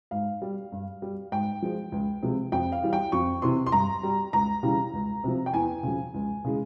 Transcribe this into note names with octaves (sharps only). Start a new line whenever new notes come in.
G#2 F5
G3
G2
G3
G#2 G5
F3 G#3
C#2
C3 F3 G#3
F2 G5
F5
E3 G3
G5
F2 C#6
C3 E3 C6
C6
G2 A#5
G3
C#2 A#5
C#3 E3 G3
C#2
C3 F3
G5
E2 G#5
C#3 F3
C#2
C#3 E3 G#3